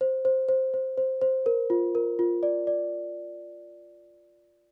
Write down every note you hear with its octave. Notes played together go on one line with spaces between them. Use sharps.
C5
C5
C5
C5
C5
C5
A#4
F4
A#4
F4
D5
D5